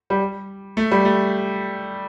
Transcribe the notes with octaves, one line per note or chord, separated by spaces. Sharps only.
G3
A3
G3
A3